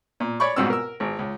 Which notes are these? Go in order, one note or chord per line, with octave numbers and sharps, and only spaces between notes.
A#2
C#5 D5 B5 C#6
C2 G#2 B2 C4 E6
A#4 E6
G#1
C#2